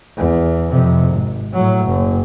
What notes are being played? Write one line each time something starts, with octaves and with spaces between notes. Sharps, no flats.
E2
F2 C3
G#1
A2 F#3
F#1